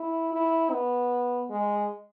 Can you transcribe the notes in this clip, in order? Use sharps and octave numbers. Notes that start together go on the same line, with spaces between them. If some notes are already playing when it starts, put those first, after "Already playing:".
Already playing: E4
E4
B3
G#3